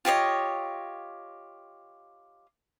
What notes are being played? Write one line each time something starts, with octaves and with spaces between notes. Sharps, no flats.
F4 G4 C#5 D#5